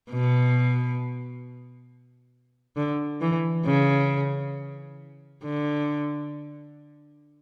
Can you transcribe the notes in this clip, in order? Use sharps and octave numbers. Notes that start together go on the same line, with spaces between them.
B2
D3
E3
C#3
D3